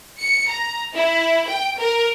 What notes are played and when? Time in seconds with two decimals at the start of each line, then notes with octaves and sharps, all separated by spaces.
0.20 C#7
0.49 A#5
0.94 E4
1.48 G5
1.79 A#4